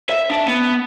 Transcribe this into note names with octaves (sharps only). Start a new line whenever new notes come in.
E5
D4
B3